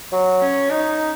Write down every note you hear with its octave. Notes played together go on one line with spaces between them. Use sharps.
F#3
C#4
D#4